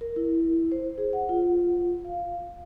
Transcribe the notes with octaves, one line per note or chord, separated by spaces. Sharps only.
A#4
E4
C5
G#4
F#5
F4
F5